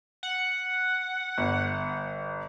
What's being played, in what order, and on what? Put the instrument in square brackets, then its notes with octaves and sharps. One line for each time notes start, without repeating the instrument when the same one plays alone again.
[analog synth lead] F#5
[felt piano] G1